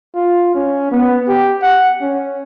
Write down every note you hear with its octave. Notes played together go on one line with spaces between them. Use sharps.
F4
C#4
B3
G4
F#5
C#4